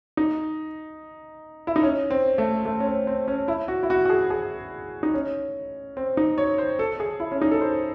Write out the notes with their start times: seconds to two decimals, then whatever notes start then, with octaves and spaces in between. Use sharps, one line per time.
0.17 D#4
1.67 E4
1.76 D#4
1.83 C#4
2.11 C4
2.38 A3
2.65 A3
2.80 C#4
2.85 C4
3.07 C4
3.28 C#4
3.48 E4
3.68 F#4
3.83 E4
3.90 F#4
4.05 F#4
4.10 G#4
4.30 G#4
5.03 D#4
5.14 C#4
5.97 C4
6.17 D#4
6.38 C#5
6.58 C5
6.79 A4
7.00 G#4
7.20 E4
7.32 C#4
7.42 D#4
7.51 A4
7.61 C5